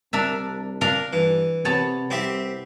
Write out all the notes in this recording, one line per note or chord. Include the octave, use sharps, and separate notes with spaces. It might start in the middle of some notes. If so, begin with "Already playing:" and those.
C2 D4 A#4 E5
D4 A#4 F5
G2 E3
C3 B3 C#5 A5
C2 C4 G4 E5